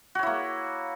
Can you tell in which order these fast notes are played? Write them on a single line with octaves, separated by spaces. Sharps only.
F#4 C#5 E4 A#3